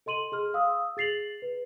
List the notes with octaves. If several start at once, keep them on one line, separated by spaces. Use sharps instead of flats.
A4 D#5 C6 D#7 F#7
G#4 C6 F6
F5 D#6 E6
G#4 A6 C7 F7 F#7
B4